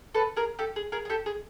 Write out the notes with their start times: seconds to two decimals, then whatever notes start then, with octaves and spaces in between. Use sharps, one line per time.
0.15 A4 B4
0.36 G#4 A#4
0.59 G4 A4
0.76 G#4
0.92 G#4 A#4
1.05 G#4
1.10 G4 A4
1.26 G#4